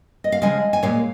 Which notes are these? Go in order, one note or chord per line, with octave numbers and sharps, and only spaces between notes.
D#5
F5
C#3 F3 G#3 D#5 G#5
G#5
A#2 G#3 C#5 F5